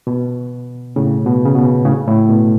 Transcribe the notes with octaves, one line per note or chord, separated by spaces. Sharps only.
B2
A2 C#3
B2
C#3
B2
A2 C#3
A2
B2